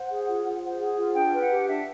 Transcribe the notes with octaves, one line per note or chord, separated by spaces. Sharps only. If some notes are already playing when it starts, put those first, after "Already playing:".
Already playing: C5 F#5
G#4
F4
F4
C5
G#4
F4
D4 G5
B4
F#5
G4
D4 E5